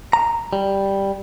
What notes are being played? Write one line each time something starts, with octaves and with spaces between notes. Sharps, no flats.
A#5
G3